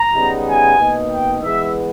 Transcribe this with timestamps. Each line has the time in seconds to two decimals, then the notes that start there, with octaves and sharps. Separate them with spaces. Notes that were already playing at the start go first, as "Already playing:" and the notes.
Already playing: A#5
0.14 C#3 G3 B3 D#4
0.47 G#5
0.78 B2 A#3 D#4
1.10 G5
1.42 E3 G#3 B3 E5